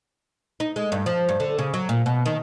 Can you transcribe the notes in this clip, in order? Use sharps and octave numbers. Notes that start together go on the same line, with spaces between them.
D#4
G#3
G2
F3
G2
D3
C#3
F#3
A#2
B2
D#3